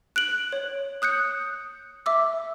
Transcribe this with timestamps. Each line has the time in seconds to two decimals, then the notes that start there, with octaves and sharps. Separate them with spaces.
0.16 F#6 D7 F#7
0.52 C#5
1.02 D#6 F#6 G6 C#7
2.06 E5 D6 E6